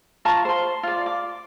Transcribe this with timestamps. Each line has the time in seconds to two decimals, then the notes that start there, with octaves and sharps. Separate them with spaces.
0.25 F4 A5 A#5 C#6
0.45 C5 C6
0.83 F4 D5
1.06 D6